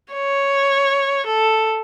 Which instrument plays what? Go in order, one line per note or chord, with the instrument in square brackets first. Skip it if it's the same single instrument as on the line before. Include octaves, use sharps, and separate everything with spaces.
[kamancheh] C#5
A4